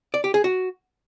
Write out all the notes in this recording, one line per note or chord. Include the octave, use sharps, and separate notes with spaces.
D5
G4
G#4
F#4